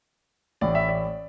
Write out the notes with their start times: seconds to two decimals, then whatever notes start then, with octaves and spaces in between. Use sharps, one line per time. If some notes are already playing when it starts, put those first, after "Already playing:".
0.61 A1 A2 E3 D5
0.75 E5
0.89 D5